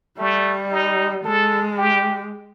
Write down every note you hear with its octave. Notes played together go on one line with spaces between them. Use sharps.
G3 A3
D#4
G#3 A4
G4